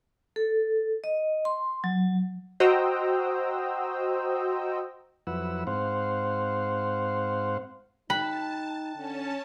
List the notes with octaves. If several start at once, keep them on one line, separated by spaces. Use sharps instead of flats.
A4
D#5
C6
F#3
F#4 C5 D#5 G5 A#5 E6
F2 F#3 E4 B4 F#5 E6
G#2 C4 C5 F5 F#5
D#4 G5 A5 B5 F#6
D3 C#4 A5